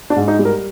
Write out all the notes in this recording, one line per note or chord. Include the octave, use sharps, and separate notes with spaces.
D4
G#2
D#4
G3
A#4